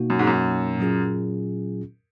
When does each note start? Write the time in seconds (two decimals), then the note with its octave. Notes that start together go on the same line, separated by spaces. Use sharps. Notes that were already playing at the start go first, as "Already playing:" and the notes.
Already playing: B2 A#3 D#4 F#4
0.10 F#2
0.19 G#2
0.27 F#2
0.79 A#2 F#3 C#4 F4 G#4